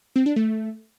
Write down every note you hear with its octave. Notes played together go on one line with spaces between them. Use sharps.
C4
D4
A3